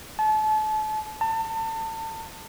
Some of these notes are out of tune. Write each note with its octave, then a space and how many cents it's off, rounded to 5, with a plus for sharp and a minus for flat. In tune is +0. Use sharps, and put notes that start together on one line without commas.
A5 -35
A5 +30